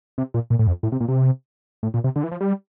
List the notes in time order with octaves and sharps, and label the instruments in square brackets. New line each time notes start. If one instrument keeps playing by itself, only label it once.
[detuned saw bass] C3
A#2
A#2
A2
F2
A2
C3
A#2
C3
A2
A#2
C3
D3
E3
F3
G3